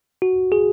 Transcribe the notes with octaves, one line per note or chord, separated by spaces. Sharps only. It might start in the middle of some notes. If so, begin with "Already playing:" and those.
F#4
G#4